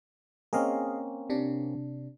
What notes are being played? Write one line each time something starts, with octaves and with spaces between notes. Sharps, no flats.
A#3 C4 C#4 G#4 D#5 F5
C3 D4